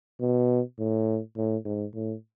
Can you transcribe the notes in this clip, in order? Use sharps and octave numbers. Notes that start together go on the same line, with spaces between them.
B2
A2
A2
G#2
A2